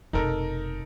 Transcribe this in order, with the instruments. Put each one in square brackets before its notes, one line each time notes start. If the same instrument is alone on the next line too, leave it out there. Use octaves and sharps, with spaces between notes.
[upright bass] F1 B2 [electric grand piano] D#4 A4 A#4